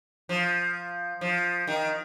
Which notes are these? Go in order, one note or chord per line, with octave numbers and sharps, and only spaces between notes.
F3
F3
D#3